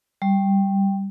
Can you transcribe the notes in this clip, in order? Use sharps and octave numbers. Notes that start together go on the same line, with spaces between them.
G3